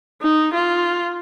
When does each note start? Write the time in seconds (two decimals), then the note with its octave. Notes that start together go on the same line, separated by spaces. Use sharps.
0.22 D#4
0.54 F4